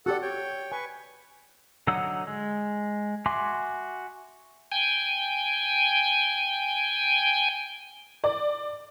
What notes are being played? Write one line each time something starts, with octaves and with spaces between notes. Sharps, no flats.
F#4 G4 A4 D5 F#5
C#5 G5
B4 G#5 C#6
D3 F#3 D#4 F#5 E6
G#3
F#4 E5 G#5 C6 D6
G5 G#5
D5